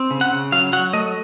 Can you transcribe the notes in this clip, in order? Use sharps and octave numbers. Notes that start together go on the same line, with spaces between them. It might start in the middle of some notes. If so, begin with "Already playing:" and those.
Already playing: C4
C#3
F#5
C#3
F#3 F5
F#3 F#5
A3 D#5